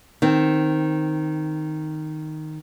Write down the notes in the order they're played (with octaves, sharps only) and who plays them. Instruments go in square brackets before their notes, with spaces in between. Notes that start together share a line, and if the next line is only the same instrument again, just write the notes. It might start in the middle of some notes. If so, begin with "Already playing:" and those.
[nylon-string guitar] D#3 C4